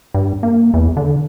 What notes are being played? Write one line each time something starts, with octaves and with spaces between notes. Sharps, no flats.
G2
A#3
E2
D3